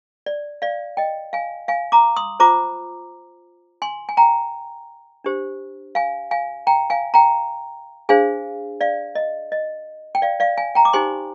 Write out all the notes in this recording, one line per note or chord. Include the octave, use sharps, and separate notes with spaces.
D5
D5 F5
D#5 G5
F5 G#5
F5 G#5
A#5 D6
C6 D#6
F4 C5 A#5 D6
G#5 C6
G#5
G5 A#5
D4 G4 C5
F5 G#5
F5 G#5
G5 A#5
F5 G#5
G5 A#5
D4 G#4 C5 F5 G#5
D5 F5
D#5
D#5
G5
D5 F5
D5 F5
F5 G#5
G5 A#5
D6
D#4 G4 C5 G#5 C6